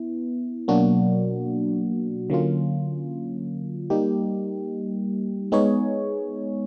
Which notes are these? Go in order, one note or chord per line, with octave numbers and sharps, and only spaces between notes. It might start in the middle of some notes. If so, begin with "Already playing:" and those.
Already playing: B3 E4
B2 F#3 A#3 D4 F#4
D3 F#3 A#3 C#4 F4
G3 A#3 D#4 G4
G#3 B3 D#4 G#4 C#5